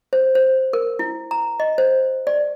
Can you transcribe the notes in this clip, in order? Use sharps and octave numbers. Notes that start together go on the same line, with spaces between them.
C5
C5
A#4
E4
A#5
D#5
C5
D5